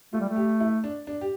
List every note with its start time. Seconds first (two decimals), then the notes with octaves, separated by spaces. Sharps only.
0.13 A3 F4
0.21 G3
0.29 A3
0.36 G4
0.60 E4
0.84 D4
1.07 D4
1.21 G4